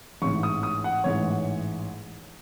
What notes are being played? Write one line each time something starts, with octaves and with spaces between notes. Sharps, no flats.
A1 G#2 E3 C#6
D#6
D#6
F#5
A1 G#2 E3 C#5